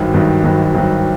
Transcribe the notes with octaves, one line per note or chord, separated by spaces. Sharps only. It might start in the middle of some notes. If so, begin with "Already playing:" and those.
Already playing: G#1 G2 D#3 F#3
G#1 G2 D#3 F#3
G#1 G2 D#3 F#3
G#1 G2 D#3 F#3